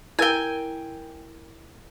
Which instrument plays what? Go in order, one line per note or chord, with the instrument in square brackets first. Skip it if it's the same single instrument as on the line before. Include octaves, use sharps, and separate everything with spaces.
[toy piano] E4 A#4 [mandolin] G5 G#5